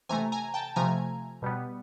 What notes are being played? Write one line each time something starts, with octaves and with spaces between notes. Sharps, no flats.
C3 E3 A3 G#5 A#5
G#5 A#5
G5 A5
C3 F3 A3 G#5 A#5
B2 G3 B3